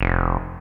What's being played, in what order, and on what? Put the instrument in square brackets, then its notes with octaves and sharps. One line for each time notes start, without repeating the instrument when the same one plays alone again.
[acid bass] F1